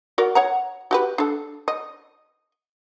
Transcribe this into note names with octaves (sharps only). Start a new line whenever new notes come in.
F#4 A#4 D5
C#5 F#5 A#5
F#4 G4 B4
D4 A4
D#5